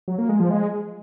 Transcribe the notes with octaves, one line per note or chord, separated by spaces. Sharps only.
F#3
A#3
G#3
F3
G#3